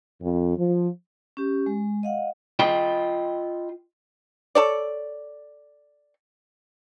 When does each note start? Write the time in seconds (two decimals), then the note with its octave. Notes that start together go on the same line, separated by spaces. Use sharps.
0.22 F2
0.56 F3
1.37 C#4 G4
1.66 G#3
2.03 D#5 F5 F#5
2.59 F4 D#5 G5 B5
4.55 A4 C#5 D5